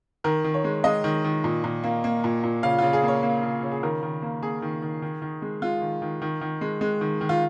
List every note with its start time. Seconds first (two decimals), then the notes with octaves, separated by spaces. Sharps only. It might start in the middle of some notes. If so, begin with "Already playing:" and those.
0.24 D#3 A#4
0.44 D#3
0.54 C#5
0.64 G#3
0.84 G#3 D#5
1.04 D#3
1.25 D#3
1.44 A#2
1.64 A#2
1.84 A#3
2.04 A#3
2.24 A#2
2.44 A#2
2.63 C#3 F5
2.79 C#3 F4
2.93 G#4
3.03 A#3 C#5
3.23 A#3
3.43 C#3
3.63 C#3
3.71 G#4
3.83 D#3 A#4
4.03 D#3
4.22 A#3
4.42 A#3 G#4
4.62 D#3
4.82 D#3
5.02 D#3
5.22 D#3
5.42 G#3
5.62 G#3 F4
5.81 D#3
6.02 D#3
6.22 D#3
6.41 D#3
6.61 G#3
6.81 G#3
7.01 D#3
7.21 D#3
7.29 F4